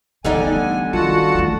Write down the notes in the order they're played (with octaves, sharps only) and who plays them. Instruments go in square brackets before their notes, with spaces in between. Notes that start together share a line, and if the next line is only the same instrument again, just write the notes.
[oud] D3 G3 D#4 [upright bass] E3 B3 [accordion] G#5
[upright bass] D#3 [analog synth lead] F4 [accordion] F#4 F#5 A5
[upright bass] E3 A3